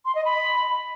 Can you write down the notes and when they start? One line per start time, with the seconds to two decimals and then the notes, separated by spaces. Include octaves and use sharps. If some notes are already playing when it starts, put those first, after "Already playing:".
0.05 C6
0.15 D#5
0.25 B5